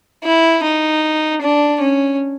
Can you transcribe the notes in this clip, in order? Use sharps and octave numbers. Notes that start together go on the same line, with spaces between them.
E4
D#4
D4
C#4